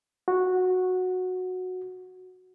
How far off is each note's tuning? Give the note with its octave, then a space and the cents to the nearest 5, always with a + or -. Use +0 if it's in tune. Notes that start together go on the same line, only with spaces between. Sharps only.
F#4 -10